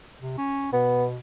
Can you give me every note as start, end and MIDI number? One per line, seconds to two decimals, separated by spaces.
0.21 0.37 48
0.38 0.71 61
0.73 1.17 47
0.73 1.05 59